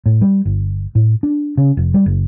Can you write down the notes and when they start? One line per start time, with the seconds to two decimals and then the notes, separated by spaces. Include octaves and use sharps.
0.06 A2
0.21 G3
0.46 G1
0.95 A2
1.23 D4
1.57 C#3
1.77 F1
1.94 G3
2.06 F#1